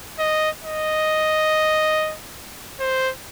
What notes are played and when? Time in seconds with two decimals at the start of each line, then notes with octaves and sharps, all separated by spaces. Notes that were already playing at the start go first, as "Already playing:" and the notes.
0.19 D#5
0.63 D#5
2.80 C5